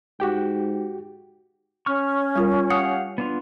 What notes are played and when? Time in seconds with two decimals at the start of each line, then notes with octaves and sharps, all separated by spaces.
0.20 G#2 F#4 G4 G5
1.86 C#4 C#6 F6
2.36 G3 F4 A#4
2.70 G4 F5 F#5 D#6
3.18 B3 D4 F4